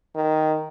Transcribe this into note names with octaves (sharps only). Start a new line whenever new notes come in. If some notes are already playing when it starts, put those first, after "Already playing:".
D#3